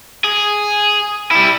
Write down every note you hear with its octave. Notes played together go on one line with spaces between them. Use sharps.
G#4
G3 E4